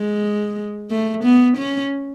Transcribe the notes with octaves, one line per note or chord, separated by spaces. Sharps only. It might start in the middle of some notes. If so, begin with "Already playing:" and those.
Already playing: G#3
A3
B3
C#4